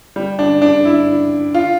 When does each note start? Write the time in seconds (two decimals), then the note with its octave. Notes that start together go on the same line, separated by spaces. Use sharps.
0.16 G3
0.39 D4
0.62 D4
0.85 E4
1.54 F4